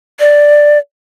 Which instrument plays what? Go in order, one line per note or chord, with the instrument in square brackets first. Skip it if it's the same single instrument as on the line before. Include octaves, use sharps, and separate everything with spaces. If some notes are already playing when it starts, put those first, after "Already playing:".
[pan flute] D5